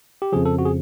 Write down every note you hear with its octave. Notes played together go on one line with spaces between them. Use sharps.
G4
F2 C#3 F3 G#4
A4
F#4
G#4